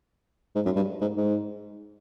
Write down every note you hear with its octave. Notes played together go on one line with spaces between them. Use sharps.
G#2
F#2
G2
G#2
G#2